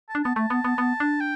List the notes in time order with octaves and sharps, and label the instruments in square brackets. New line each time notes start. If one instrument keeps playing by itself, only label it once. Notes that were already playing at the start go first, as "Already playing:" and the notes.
[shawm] A5
[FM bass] D4
[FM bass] B3 [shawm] A5
[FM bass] A3 [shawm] A5
[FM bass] B3
B3
B3
D4
[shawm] G5